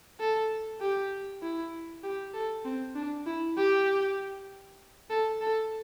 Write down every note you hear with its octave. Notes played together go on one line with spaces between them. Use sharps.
A4
G4
E4
G4
A4
C4
D4
E4
G4
A4
A4